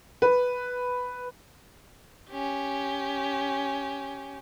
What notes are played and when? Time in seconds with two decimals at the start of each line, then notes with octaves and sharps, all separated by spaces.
0.22 B4
2.30 C#4 G4